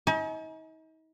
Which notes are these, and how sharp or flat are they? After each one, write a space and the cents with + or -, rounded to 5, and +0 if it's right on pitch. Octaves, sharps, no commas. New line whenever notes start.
D#4 +40 G#5 +45